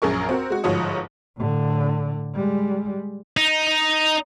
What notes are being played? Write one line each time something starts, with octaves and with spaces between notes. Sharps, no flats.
A#1 F#2 G#4 A#4 C#6
C4 F#4 A#4
G#3 F#4
G1 G#2 F3 F#4 C#5 D#6
A2 D3
G3 G#3
D#4